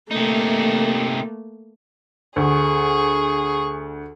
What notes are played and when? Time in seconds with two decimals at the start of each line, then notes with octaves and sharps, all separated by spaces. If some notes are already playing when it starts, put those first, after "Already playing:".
0.11 C3 A3 A#3 D#4
2.36 D2 G#4 C#6